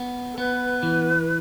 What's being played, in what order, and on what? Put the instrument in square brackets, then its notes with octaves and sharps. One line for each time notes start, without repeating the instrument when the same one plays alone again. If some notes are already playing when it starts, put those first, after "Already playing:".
Already playing: [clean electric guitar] B3
[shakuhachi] A4
[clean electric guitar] B3 [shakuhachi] B4
[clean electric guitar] E3